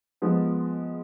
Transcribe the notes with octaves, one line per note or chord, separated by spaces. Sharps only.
F3 G#3 B3